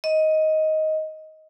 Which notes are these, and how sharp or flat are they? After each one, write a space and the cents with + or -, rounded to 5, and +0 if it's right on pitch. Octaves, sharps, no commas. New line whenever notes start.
D#5 +10